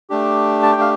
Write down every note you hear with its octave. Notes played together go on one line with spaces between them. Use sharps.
A3 D4 G4
A5
G5
F5